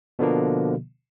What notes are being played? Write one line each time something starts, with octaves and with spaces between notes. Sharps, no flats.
B2 D3 F3 A#3